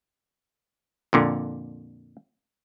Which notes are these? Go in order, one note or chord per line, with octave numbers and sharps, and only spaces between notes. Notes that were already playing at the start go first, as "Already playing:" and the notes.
F2 A#2 D3